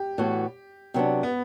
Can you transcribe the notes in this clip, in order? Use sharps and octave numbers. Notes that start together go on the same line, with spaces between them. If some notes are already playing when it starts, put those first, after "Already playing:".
Already playing: G4
A2 E3 B3 F#4
C3 F#3 B3 D4
B3